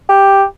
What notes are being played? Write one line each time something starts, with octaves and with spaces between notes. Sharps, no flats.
G4